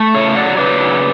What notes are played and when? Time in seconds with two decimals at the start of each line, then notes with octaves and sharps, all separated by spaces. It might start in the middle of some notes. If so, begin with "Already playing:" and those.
Already playing: A3
0.14 C#3 C#5 E5
0.35 F#3 D5 F#5
0.57 C#3 B4 D5
0.80 F#3